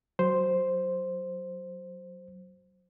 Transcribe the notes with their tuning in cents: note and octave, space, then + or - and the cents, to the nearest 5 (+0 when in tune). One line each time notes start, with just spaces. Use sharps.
F#3 +0 C5 +0